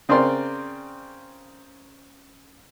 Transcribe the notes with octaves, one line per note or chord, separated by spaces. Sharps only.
C#3 C4 A#4 D5 C6